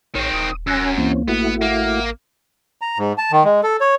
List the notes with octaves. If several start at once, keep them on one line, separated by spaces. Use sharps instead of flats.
A#1 D#3 C4 C#5
D#1 D#6
F#2 C#4 G#5 E6 F#6 A#6
C#2 E3 A#3 C4 C#4
A1 A3 B3 E4 F#4
A#3 E5 F#5 D6
A#5
G#2
A5
D#3
G#3
A4
C#5